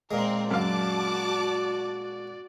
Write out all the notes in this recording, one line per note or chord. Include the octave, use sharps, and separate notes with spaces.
A#2 G#3 C4 A#4
F#2 F#4 D5 F5 A5 D6